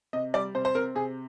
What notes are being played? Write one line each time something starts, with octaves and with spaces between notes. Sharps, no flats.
C3 D#5
G3 D5
C3 C5
C5
C4 A#4
C3 G#4